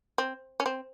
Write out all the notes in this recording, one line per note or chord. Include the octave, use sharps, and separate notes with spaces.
C4
C#4
C4